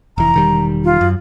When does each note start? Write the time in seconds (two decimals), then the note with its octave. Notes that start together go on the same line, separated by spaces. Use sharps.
0.18 F1 E3 A#5
0.34 E1 D#3 G3
0.84 F4
1.01 F#2